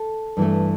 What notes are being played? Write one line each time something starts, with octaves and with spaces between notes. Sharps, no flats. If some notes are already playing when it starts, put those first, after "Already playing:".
Already playing: A4
G2 E3 A3